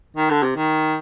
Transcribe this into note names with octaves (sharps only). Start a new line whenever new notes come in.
D#3
D3
C3
D#3